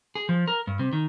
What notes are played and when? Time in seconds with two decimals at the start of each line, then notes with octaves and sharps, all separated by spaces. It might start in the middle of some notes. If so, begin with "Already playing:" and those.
0.15 G#4
0.29 F3
0.48 A#4
0.67 G2
0.79 C3
0.93 D#3